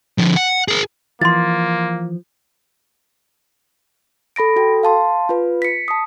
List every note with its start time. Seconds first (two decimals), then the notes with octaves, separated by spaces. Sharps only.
0.18 D3 F3
0.36 F#5
0.68 G#4 A#4
1.21 E3 F3 A#3 C6 A6
4.36 A4 B5 A#6 D7
4.56 F#4 A4 G5
4.83 F5 A5 C6
5.29 F4 B4
5.62 B6 C#7
5.88 A5 D#6